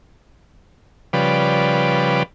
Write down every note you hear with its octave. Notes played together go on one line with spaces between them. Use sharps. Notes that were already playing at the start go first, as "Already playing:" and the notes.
C#3 F3 G3 B4 D5